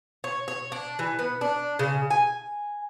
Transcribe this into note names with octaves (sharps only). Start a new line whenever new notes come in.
C#5
C#5
D4
E3
B3
D4
C#3
G#5